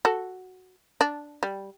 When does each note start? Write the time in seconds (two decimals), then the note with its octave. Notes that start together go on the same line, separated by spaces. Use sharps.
0.05 F#4 A4
1.01 D4
1.43 G3